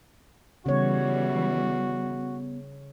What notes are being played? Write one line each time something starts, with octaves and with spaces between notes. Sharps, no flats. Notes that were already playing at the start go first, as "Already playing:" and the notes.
C#3 E3 G3 B3 F#4 C#5